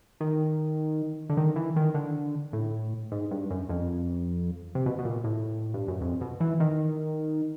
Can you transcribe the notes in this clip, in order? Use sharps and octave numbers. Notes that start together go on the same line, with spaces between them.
D#3
D3
D#3
E3
D#3
D3
A2
G#2
G2
F#2
F2
C3
B2
B2
A#2
A2
G2
F#2
F2
B2
E3
D#3